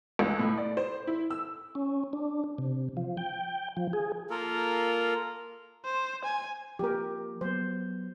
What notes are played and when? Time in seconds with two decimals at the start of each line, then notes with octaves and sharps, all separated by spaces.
0.19 C#2
0.39 A2
0.57 D5
0.77 C5
1.07 E4
1.31 E6
1.75 C#4
2.13 D4
2.58 C3
2.97 F3
3.17 G5
3.77 F3
3.93 G#4
4.30 A#3 F4 A4 A#4
5.84 C5
6.25 G#5
6.79 F3 A#3 G4 A#4
7.41 F#3 B3 C5